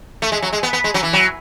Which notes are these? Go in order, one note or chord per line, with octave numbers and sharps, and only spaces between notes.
A3
G#3
F#3
G#3
B3
B3
G#3
F#3
E3
F#3